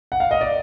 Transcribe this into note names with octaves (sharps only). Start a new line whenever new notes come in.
F#5
F5
D#5
D5